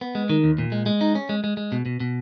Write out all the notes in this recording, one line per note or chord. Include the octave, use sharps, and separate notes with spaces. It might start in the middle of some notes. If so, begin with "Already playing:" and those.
B3
G#3
D#3
D#2
A#2
G#3
G#3
D#4
C#4
G#3
G#3
G#3
B2
B2
B2